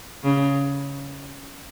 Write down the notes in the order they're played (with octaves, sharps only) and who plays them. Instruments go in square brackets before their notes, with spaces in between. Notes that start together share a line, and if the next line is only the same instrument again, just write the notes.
[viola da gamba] C#3